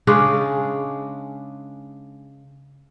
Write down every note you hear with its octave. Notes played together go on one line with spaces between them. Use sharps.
C#3 G#3 C#4 D4